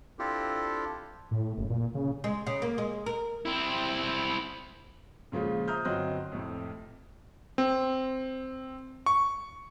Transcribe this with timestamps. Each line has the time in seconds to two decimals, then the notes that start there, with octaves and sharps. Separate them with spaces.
0.19 C4 D4 E4 F4 G4 A4
1.31 A2
1.57 F#1
1.70 A#2
1.95 C#3
2.24 G#3
2.47 C#3
2.62 A#3
2.78 G#3
3.06 A#4
3.46 C4 E4
5.32 A#2 C#3 F3 G#3 F4
5.68 C5 E5 A#5 D#6 F6 G6
5.85 G1 F#3 C4 D#5 F#6
6.32 F2 A2 C3
7.58 C4
9.06 C#6